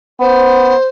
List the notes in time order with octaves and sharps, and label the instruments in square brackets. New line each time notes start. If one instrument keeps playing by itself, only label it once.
[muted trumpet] B3 [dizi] C5